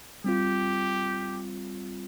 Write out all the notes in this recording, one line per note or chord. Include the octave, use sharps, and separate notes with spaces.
G3 C4 F4 G4